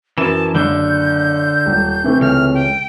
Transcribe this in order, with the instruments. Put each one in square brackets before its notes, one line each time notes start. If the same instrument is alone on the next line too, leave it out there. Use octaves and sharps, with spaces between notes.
[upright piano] F#2 A#4 E7 [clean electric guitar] E3 [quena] A5
[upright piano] F#1 G7 [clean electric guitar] D3 [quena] G6
[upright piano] D#1
C3 E3 A3
[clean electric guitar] C#2 [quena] F6
[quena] G5